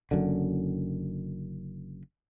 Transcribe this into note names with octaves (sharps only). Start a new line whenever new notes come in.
F#1 F#2 D3